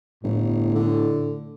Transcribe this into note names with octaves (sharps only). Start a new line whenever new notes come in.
G1 A2
D3